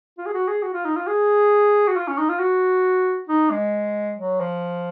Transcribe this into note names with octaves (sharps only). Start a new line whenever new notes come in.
F4
G#4
F#4
G#4
F#4
F4
D#4
F4
G#4
F#4
F4
C#4
D#4
F4
F#4
D#4
G#3
F#3
F3